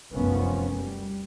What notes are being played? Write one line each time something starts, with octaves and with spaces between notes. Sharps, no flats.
F1 C2 F#2 F3 B3 C#4
G3